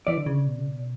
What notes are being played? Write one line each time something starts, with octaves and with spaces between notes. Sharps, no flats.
E3 D5
D3
C#3
B2
C#3
B2